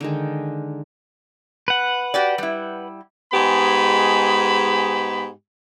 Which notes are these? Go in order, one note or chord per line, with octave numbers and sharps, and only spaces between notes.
D3 D#3 G#3
B4 F#5
F#4 G4 D5
G3 E4
G#2 G#3 B3 G4 G#4 B5